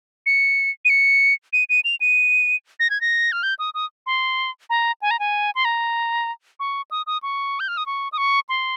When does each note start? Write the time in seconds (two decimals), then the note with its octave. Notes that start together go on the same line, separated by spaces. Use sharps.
0.26 C#7
0.85 D#7
0.90 C#7
1.53 D#7
1.69 D#7
1.85 F7
2.01 D#7
2.80 A#6
2.90 G#6
3.01 A#6
3.32 F6
3.43 G6
3.59 D#6
3.74 D#6
4.06 C6
4.70 A#5
5.02 G#5
5.11 A#5
5.19 G#5
5.55 C6
5.65 A#5
6.60 C#6
6.91 D#6
7.07 D#6
7.23 C#6
7.60 G6
7.68 F6
7.77 D#6
7.86 C#6
8.12 D#6
8.18 C#6
8.49 C6